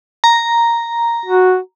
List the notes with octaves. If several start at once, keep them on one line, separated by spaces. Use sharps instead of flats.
A#5
F#4